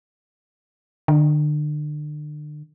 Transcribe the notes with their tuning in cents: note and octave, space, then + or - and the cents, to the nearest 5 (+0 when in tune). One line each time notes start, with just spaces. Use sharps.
D3 +35